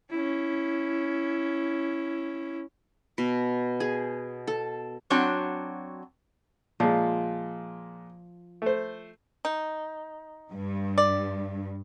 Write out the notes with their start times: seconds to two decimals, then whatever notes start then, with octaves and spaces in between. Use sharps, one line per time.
0.10 C#4 E4
3.18 B2
3.80 G#4
4.47 A4
5.10 F#3 C4 D4 F#4 C#5
6.80 A#2 F3 G#3
8.62 A3 C5
9.45 D#4
10.52 G2
10.98 D5